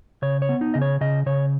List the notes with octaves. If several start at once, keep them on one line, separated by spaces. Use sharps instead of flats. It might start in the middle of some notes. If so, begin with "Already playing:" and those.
C#3 C#5
C#5
B3
D#4
C#3 D#5
C#5
C#3 D#5
C#3 C#5